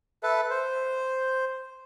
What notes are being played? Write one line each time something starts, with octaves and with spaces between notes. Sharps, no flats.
A4 B4 E5
C5